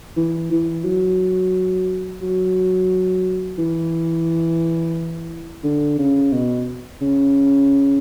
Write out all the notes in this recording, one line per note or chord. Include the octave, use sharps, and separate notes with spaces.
E3
E3
F#3
F#3
E3
D3
C#3
B2
C#3